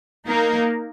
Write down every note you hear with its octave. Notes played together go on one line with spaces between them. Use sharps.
A#3 D#4 A#4